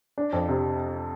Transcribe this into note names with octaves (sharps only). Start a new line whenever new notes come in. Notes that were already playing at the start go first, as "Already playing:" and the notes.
D4
F2
C3